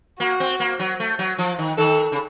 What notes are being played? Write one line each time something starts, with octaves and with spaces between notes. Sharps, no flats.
A#3 F#4
C4
A#3
F#3
A3
F#3
F3
D#3
D#3 A4
C#3